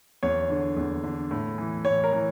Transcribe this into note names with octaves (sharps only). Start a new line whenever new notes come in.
E2 C#5
D3
E2
D3
A2
E3
A2 C#5
A#4
E3